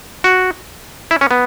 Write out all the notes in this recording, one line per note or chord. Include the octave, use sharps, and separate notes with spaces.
F#4
E4
C#4
B3